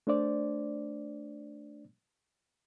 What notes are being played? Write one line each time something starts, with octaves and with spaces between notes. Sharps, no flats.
A3 D4 C5 D5